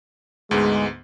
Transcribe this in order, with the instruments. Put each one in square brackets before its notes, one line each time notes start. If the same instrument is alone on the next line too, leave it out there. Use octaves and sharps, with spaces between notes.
[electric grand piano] D2 G#2 B3 [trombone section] G#3